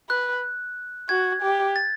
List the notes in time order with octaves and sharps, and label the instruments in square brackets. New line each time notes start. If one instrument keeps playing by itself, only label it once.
[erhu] B4 [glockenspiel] F#6
[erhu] F#4 [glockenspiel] G#6
[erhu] G4
[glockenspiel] A6